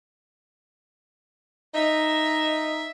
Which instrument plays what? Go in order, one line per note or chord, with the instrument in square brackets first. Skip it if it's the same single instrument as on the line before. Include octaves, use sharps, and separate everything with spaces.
[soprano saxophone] D#4 [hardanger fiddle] E5